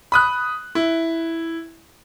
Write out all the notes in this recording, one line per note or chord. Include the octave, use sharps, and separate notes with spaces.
B5 D#6 F#6
E4